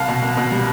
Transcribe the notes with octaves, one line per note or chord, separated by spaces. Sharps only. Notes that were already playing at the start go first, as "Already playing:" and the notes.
Already playing: C2 F5 A5
B2
C2
B2
G3